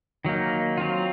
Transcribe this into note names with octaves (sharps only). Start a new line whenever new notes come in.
D#3 F#3 A#3 D#4
F#3 C4 F4